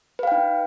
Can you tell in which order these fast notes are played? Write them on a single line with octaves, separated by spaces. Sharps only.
B4 F5 G5 D#4